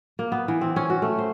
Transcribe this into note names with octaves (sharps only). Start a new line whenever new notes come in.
A#3
B3
E3
C4
C#4
F#4
A3
C5